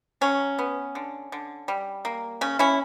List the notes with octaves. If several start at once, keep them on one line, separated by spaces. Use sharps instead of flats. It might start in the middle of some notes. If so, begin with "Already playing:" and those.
F#3 C#4
B3
D3
D3
G3
A#3
C#3 C#4
C#4 E4